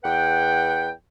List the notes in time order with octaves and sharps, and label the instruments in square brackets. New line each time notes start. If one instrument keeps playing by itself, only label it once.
[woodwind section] E2 B4 F#5 G5